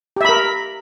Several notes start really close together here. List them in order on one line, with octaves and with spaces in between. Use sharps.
G4 E5 B5 A#4